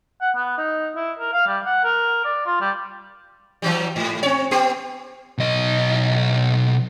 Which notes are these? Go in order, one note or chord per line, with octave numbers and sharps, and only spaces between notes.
F#5
B3
D#4
E4
A#4
F5
G3
F#5
A#4
D5
F4
G3
E3 F#3 G3
G#2
C4 C#5
B3 G4
B1 D#5